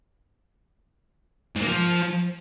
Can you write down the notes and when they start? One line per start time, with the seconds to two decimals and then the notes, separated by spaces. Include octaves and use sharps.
1.56 G#2
1.62 A#3
1.68 F3